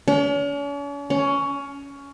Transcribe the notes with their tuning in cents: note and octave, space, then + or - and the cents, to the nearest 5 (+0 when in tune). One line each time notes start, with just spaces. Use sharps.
C#4 +45
C#4 +15